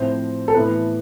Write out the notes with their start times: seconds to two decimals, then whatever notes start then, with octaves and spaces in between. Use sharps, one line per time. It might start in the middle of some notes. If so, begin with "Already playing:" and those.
Already playing: A2 F3 C4 C5
0.48 A4
0.54 A2 E3 B3 B4